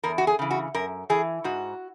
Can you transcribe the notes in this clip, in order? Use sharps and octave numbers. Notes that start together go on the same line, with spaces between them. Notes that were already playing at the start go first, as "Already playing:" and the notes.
E2 A#4
F#4
G#4
C#3 E3
F#4
F#2 A#4
E3 G#4
G#2 F#4